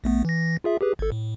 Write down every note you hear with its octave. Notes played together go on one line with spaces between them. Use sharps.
A#1 A3 B3
E3 A#6
F4 G#4 E5
G4 G#4 B4
G#1 A4
A2